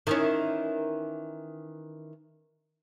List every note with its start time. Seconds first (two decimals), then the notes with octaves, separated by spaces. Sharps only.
0.07 D#3 E3 C#4